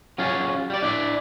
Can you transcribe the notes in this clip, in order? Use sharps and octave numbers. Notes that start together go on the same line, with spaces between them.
F#3 C#4 F4 G#4
G3 D5
D4 E4 D5